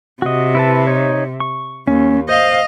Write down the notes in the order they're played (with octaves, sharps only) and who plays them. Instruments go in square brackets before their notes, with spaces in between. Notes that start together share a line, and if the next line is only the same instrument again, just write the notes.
[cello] C3 [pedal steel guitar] F#4 D#5
[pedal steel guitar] E4 B4 A5
D#4 C#5
C#6
[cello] D#2 [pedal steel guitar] C#4
[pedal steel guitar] C5 [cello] D#5 F5